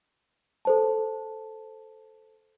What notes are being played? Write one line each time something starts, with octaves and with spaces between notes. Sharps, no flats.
A4 C5 A5